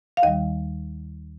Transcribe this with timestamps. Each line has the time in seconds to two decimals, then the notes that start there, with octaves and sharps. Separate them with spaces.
0.17 F5
0.23 D#2 D#3 G3 D#5